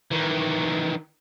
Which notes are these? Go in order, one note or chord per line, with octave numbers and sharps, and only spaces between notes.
D#3 E3